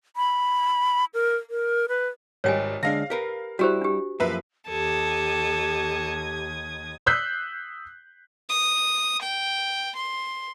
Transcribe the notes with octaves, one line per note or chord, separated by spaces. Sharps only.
B5
A#4
A#4
B4
G#1 G3 C#5 D#5 G5 G#5
D3 G#3 D4 F5 A#6
G4 A#4 B4
G3 E4 F#4 G4 C5
D4 G4
F#2 F3 A#3 B4 E5
D#2 G4 A4 D#6 G#6
D#6 E6 F#6 G6 B6 C7
D#6
G5
C6